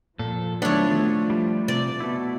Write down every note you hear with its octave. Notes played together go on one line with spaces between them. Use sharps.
A#2 F3 A4
D#3 F#3 A3 B3 D4 E4 C#5
A3
G3
C3 D5
B2 A3 E4